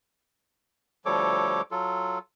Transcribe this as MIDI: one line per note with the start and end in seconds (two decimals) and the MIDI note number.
1.06 1.62 38
1.06 1.62 53
1.06 1.62 55
1.06 1.62 69
1.06 1.62 73
1.06 1.62 86
1.71 2.19 54
1.71 2.19 65
1.71 2.19 69